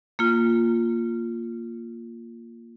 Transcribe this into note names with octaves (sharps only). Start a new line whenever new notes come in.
A#3 F4